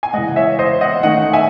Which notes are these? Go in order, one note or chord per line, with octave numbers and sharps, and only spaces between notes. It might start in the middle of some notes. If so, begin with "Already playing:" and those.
G#5
C#3 E3 G#3 D#5 F#5
C#5 E5
C5 D#5
D#5 F#5
D#3 A3 C#4 D#5 F#5
E5 G#5